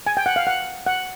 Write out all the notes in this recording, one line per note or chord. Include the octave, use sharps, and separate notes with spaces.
G#5
G5
F#5
F5
F#5
F#5